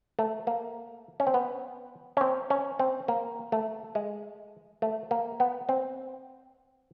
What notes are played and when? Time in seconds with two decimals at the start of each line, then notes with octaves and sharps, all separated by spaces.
0.19 A3
0.47 A#3
1.20 C#4
1.27 C4
1.34 B3
2.17 C#4
2.21 C4
2.50 C#4
2.79 C4
3.08 A#3
3.52 A3
3.95 G#3
4.82 A3
5.11 A#3
5.40 B3
5.69 C4